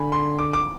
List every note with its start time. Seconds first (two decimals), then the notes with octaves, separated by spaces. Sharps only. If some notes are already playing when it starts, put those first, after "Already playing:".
Already playing: D3 G#5 B5
0.12 C6
0.39 D6
0.53 D6